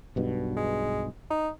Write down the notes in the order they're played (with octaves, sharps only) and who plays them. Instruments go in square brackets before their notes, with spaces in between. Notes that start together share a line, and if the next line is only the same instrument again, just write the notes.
[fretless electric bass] B1 G2 B2
[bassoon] G#3
D#4